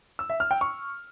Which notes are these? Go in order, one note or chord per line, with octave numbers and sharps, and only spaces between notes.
E6
E5
F6
G5
C#6